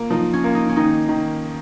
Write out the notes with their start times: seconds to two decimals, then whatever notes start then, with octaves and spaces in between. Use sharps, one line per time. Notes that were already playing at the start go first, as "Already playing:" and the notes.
Already playing: A#3 F4
0.10 F3 D#4
0.33 C#4
0.44 A#3 F4
0.55 D#4
0.69 C#4
0.76 D#3 D#4
1.09 D#3